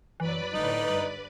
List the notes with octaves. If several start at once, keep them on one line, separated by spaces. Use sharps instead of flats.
F#1 E3 F#3 B4 D5 B5
D#1 A2 D3 D#4
G2